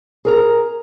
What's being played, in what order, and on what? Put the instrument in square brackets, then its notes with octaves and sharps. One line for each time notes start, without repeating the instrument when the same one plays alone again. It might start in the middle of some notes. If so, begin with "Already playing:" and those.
[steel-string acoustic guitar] G#4 A#4 A#5